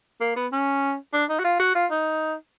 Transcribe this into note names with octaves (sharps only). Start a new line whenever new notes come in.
A#3
B3
C#4
D4
D#4
F#4
F4
F#4
F4
D#4